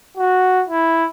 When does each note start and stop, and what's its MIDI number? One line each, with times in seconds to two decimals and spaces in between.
0.17 0.63 66
0.69 1.06 64